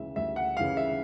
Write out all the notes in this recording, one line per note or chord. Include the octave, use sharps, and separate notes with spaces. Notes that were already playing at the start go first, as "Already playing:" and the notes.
Already playing: D2 C#3 E3 G#3 E5
D2 E5
F#5
C#3 E3 G#3 F5
E5